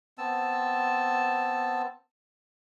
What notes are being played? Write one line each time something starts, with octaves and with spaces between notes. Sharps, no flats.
B3 C4 A5 E6